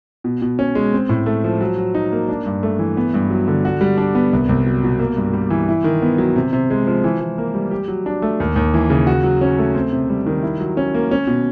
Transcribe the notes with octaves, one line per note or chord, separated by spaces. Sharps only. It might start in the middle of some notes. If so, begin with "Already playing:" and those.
B2
B2
C#4
G#3
C4
A2
A3
F3
F#3
F#3
D#4
A#3
D4
G2
A3
E3
B3
G2
F#3
D3
F#4
G3
D4
B3
C2
C2
F#3
B2
A#3
G2
G3
E3
E4
D#3
B3
F#3
C3
C3
G#3
F3
E3
E3
A#3
G3
G4
F#3
D4
A3
D#2
D#2
E3
C#3
F#4
F#3
C#4
A3
C4
C3
G3
D#3
E4
F#3
C#4
A#3
C#4
B2